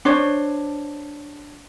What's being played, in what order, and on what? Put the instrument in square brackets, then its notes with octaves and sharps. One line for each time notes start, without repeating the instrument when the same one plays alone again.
[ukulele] D4 C5 C#5